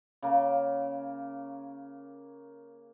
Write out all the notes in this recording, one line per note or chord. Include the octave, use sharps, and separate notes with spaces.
C#3 A#3